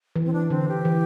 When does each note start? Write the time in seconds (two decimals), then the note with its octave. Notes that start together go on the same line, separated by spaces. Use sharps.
0.16 E3
0.26 C4
0.33 D4
0.50 D3 C4
0.68 G4
0.85 E3